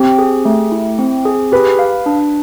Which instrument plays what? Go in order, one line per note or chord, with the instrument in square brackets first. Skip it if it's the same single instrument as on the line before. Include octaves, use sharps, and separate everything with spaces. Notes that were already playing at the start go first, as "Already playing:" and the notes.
Already playing: [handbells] C4 [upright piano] G4
[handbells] G#4
A3
E4
C4
G#4
[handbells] G4 [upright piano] B4
[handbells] F5
D4